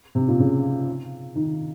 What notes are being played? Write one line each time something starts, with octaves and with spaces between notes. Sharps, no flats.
C3
A#2
C#3
D#3